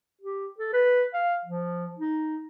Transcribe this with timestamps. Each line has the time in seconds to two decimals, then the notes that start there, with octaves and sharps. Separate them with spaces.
0.21 G4
0.58 A4
0.73 B4
1.14 F5
1.45 F3
1.99 D#4